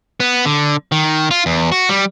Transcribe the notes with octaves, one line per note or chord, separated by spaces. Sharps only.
B3
D3
D#3
F4
E2
F#4
G3